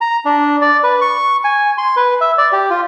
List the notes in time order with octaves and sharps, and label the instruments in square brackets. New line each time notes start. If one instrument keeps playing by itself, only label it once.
[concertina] A#5
D4
D5
B4
C#6
G#5
C6
B4
E5
D5
G4
F4